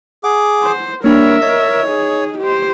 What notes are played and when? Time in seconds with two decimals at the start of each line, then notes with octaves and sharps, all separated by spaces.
0.24 G#4 F#5 D6
0.63 C5
1.04 G3 A#3 D4 A#4 C#5 E5
1.42 C#5 D#5
1.87 D#4 G#4
2.39 G4 C5